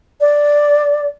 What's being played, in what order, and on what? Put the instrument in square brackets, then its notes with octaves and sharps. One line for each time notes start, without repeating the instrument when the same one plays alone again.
[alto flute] D5